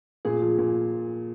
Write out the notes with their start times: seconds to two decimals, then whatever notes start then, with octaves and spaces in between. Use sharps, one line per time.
0.25 A#2 G#4
0.42 F3
0.58 A#2